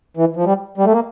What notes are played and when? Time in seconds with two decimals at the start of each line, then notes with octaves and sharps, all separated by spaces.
0.17 E3
0.36 F3
0.45 G3
0.78 G3
0.85 A3
0.92 A#3